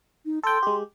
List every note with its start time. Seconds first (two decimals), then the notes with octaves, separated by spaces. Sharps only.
0.26 D#4
0.43 A4 G5 C6
0.63 G#3 G4